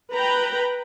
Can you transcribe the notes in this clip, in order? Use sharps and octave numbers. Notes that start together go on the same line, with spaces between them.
B4 G5 A#5 B5